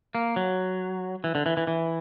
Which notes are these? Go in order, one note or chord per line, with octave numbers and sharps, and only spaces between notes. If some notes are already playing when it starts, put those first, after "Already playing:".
A#3
F#3
E3
D3
E3
E3
E3